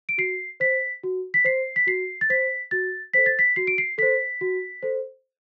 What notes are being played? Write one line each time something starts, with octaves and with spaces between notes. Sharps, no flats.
D7
F#4 C7
C5 B6
F#4
B6
C5 C7
B6
F#4 C7
A6
C5 B6
F#4 A6
A4 C5 B6
A6
B6
F#4 C7
D7
C7
A4 C5 B6
F#4
A4 C5